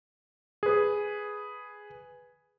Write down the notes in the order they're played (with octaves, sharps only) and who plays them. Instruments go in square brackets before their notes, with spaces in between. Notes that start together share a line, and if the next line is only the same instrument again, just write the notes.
[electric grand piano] G#4 B4